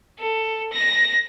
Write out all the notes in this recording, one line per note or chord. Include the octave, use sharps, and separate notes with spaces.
A4
A#6